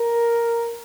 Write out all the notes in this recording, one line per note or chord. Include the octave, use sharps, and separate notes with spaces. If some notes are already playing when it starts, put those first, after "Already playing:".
Already playing: A#4